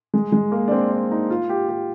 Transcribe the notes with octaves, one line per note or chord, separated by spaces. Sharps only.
G#3
G#3
A#3
D4
C4
D4
D#4
F4
G4
G4